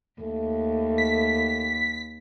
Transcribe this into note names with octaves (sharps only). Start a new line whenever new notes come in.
D#2 A3
B6